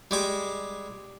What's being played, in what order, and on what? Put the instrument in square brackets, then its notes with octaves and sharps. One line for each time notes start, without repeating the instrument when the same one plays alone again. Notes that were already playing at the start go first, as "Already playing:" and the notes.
[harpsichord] G3 G#3 D6